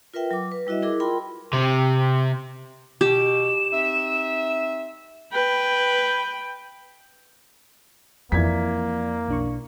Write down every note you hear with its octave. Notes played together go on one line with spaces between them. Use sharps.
F4 A#4 B4 E5 G5
F#3 D6
B4
G3 E4 F#4 D#5 E5
E4 G#4 A#4 D6
F4 A#4 G5 B5 C6
C3
B2 G4 E7
C4 D#4 E5
B4 G5
F2 E3 F3 A#3 D5 G#6 B6
B1 D4 C#6